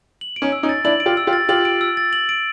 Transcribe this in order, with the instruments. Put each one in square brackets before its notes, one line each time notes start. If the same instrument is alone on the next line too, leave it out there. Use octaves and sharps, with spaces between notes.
[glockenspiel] F#7
D7
[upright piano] C#4 D#4
[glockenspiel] E6
[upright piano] C#4 D#4
[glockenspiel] A6
[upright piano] D4 E4 [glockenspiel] F#7
[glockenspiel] D7
[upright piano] F4 G4
[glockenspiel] E6
[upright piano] F4 G4
[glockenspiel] A6
[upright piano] F4 G4 [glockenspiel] F#7
[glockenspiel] D7
E6
A6
F#7
D7